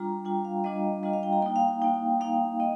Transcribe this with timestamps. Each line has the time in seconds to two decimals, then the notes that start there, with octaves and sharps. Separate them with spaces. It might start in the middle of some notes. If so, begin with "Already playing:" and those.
Already playing: G3 D4 F4 A#5
0.25 G3 D4 F4 G5
0.45 F5
0.64 G3 D4 F4 D#5
1.03 G3 D4 F4 D#5
1.13 F5
1.23 G5
1.33 A#5
1.42 A#3 G5
1.46 D#4
1.56 F5
1.68 F5
1.82 A#3 D#4 G5
2.21 A#3 D#4 F5
2.60 A#3 D#4 D#5